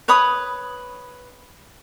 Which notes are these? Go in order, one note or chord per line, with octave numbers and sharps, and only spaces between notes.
B4 C#5 B5 D#6